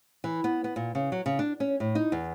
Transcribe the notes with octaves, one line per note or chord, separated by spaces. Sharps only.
E3
B3
B3
A#2
C#3
F#3
C#3
D4
C#4
A2
D#4
E2